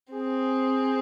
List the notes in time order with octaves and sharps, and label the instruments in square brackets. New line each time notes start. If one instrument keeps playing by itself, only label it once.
[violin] C4 [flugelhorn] G#4